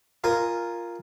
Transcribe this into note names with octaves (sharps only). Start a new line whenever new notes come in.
F4 A#4 D#5 G#5